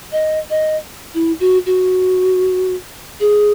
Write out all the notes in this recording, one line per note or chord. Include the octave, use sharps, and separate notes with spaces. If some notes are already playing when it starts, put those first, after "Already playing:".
D#5
D#5
E4
F#4
F#4
G#4